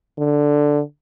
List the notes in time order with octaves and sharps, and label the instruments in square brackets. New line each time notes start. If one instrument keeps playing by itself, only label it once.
[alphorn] D3